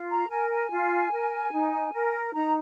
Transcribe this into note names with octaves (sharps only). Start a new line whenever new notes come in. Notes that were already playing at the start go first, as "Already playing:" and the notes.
Already playing: F4
A#5
A#4 G#5
G#5
F4
A#4
D#4
A#4
D#4 A#5